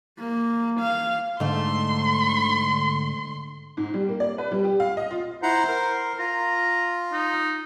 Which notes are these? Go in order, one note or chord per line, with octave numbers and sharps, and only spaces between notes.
A#3
F5
G#2 D3 A3 C6
G#2
G3
A#3
D5
B4
G3
G4
F5
D#5
F4
E4 C5 F#5 A#5
A#4
F4 A#5
D#4